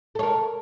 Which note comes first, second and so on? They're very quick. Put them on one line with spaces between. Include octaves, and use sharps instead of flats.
A4 C#5 A#4